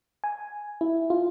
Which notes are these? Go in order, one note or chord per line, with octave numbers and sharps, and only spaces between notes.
G#5
E4
F4